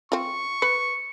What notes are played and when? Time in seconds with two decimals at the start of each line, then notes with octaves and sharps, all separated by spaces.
0.12 C4 F4 C#6
0.62 B4 C#7